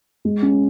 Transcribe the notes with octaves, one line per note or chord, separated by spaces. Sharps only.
G#3
C#4